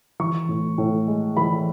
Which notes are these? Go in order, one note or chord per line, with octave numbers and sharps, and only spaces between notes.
E3 C#6
A2
A2
G#3
E3 B5